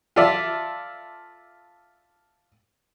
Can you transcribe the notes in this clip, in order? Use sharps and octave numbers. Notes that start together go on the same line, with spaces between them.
F4 A4 D5 E5